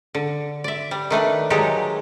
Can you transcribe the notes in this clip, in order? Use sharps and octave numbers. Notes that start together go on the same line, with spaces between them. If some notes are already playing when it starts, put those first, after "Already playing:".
D3
D5 E5
G3
D#3 A3 D4 B4
D#3 F#3 G#3 G4 A4